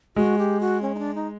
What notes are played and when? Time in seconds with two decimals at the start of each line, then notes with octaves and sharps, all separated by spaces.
0.16 G#3 F#4
0.38 G4
0.60 F#4
0.82 C#4
0.95 D#4
0.99 D4
1.15 D#4